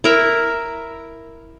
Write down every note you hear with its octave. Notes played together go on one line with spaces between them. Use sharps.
E4 A#4 E5